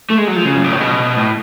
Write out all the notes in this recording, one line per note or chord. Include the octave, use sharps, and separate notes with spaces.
A3
G#3
F#3
F3
C#3
F#2
G#2
A2
B2
A2